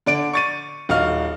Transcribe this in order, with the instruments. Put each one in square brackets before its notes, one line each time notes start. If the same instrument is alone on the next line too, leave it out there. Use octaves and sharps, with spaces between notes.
[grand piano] D3 D5 D7
C#6 A6 D#7
D#1 F#4 D#5 F5 F6